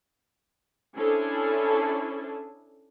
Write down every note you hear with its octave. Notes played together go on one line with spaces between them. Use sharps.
C#4 D4 E4 G#4 A4 C5